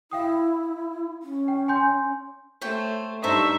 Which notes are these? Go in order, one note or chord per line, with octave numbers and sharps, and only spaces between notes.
E4 F5 G5 D#6
C#4
G5
G#5 C6 G6
A3 C5 C#5 G5
G2 D#4 A4 C5 E5 A#5 C#6